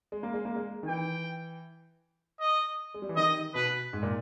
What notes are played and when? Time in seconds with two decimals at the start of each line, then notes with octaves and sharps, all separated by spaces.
0.12 G#3
0.23 A#3
0.34 G#3
0.45 A#3
0.56 G#3
0.83 D#3
0.87 E3 G5
2.40 D#5
2.94 G#3
3.02 G3
3.09 E3
3.17 D#3 D#5
3.55 B2 B4
3.93 G#2
4.03 A#2